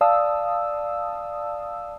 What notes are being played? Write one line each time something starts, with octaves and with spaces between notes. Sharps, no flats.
D5 F5 A5 D#6 E6